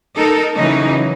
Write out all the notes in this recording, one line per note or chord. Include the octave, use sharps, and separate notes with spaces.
D#4 A4 A#4
C#3 E3 F#3 C#4 D#4